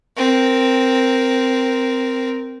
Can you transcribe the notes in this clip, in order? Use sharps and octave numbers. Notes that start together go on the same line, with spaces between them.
C4 A#4